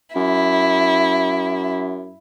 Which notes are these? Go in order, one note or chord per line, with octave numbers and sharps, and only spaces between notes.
F#2 E4